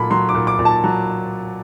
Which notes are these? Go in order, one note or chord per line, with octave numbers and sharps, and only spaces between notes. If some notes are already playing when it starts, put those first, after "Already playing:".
Already playing: A#2 F#3 A3 A5 B5
F#3 C6
D6
A#2
D6
A#2
A5
F#3